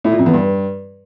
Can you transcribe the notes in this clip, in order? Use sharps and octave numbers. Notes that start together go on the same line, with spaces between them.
A2
A#2
F2
E2
G2